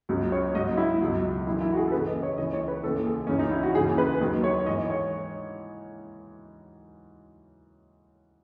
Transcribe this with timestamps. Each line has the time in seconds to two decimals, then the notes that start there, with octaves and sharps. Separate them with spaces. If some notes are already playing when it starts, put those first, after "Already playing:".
0.09 C#2 C#3 F#3
0.32 C#5
0.55 G#2 F#3 D#5
0.77 E4
1.00 C#2 B2 F#3
1.46 F#2 E4
1.49 E3
1.61 E4
1.72 F#4
1.77 G#4
1.88 A4
1.92 D#2 C#3 E3 B4
2.07 D#5
2.23 C#5
2.38 C#2 C#3 E3 D#5
2.53 C#5
2.68 B4
2.83 D#2 C#3 E3 A4
3.06 G#4
3.27 C#2 C#3 E3 C#4
3.39 D#4
3.51 E4
3.63 F#4
3.75 D#2 C#3 E3 G#4
3.98 B4
4.20 D#2 D#3 F#3
4.44 C#5
4.66 G#2 E3 D#5
4.90 C#5